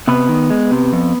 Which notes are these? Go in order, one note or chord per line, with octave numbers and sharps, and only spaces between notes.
C3 B3 B4
D#3
G#3
C3
F2